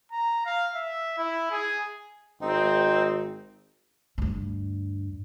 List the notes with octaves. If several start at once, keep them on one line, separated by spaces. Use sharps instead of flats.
A#5
F5
E5
E4
G#4
G#1 C4 D#4
D2 G2